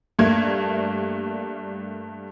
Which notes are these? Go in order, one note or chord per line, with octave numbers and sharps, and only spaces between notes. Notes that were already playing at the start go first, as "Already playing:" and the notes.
G2 G3 A3 A#3 G#6